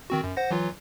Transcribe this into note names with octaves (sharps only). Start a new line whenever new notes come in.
D#3 C4 F#4
F#2
C5 F#5 A#6
E3 F#3 F4